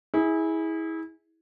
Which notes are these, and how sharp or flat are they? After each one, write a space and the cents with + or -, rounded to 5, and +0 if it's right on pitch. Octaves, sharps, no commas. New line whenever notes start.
E4 -25 G#4 +0